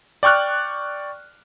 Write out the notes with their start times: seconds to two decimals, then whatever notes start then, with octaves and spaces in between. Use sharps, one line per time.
0.23 D5 G5 C#6 F6 F#6